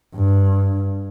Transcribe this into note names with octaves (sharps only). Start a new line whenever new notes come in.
G2